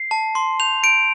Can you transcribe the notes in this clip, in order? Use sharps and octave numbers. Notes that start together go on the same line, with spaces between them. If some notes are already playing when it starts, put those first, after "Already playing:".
Already playing: C7
A5
C6
G6 F7
G6 D7